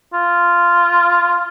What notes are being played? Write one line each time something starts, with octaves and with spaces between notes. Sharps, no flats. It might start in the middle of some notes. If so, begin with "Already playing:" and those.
F4